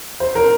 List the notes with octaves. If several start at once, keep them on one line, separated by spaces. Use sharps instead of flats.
C5
A#4